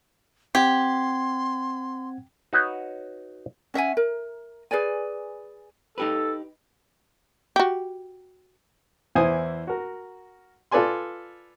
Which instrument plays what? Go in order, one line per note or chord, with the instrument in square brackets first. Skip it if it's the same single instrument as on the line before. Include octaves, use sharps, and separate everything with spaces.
[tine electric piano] C4 F#5 G#6 [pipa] G4 [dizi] C6
[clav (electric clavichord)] D#4 F#4 B4 C#5
[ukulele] C#4 E5 F#5 G#5
A#4
G#4 B4 D5 G#5
[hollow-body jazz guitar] D#4 G4 B4 [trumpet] A4
[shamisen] F#4 G4
[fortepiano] E2 E3 E4 C5 G#5 D#6
F#4 A#4
F4 A4 B4 D5 G#5 C6